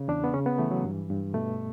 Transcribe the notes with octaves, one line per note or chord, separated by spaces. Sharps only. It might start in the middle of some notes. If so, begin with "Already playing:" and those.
Already playing: C#3
E2 D4
B3
C#3 C#4
B3
E3 A3
F#3
G2
G2
B2 A3